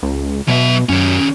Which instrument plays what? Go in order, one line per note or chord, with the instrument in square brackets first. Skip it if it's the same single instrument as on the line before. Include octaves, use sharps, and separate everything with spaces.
[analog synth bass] C#2
[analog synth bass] B2 [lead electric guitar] F#3 E5
[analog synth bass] F#2 [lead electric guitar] D#3 C#4